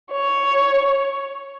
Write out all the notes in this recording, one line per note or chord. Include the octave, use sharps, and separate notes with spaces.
C#5